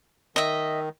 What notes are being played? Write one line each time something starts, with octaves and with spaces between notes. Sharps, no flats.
D#3 D#5 E5